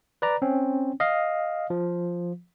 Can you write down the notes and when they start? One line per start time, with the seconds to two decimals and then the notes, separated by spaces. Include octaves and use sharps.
0.22 B4 D5 A#5
0.42 C4 C#4
1.00 D#5 F5
1.70 F3